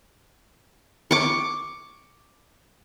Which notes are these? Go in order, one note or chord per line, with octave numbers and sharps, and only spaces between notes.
C#6 D6